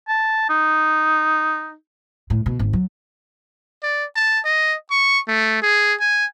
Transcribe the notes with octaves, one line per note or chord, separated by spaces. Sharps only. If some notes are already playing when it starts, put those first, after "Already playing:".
A5
D#4
A2
B2
G#1
F#3
D5
A5
D#5
C#6
A3
G#4
G#5